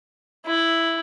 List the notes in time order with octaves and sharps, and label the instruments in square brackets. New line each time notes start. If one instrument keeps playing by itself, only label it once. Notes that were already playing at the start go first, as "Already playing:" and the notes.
[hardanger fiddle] E4